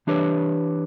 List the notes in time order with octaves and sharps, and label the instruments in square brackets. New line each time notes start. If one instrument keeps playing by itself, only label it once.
[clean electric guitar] E3 D4 G4 B4 C#5